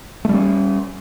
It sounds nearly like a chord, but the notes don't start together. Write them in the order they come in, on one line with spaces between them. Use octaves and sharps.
A3 G3 C#4